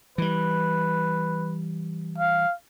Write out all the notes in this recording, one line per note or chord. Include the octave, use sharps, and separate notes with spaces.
E3 G3 B4
F5